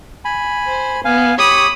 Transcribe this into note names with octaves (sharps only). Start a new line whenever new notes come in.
G#5 B5
C5
B3 F5 G#5
G4 C#5 B5 C#6 D#6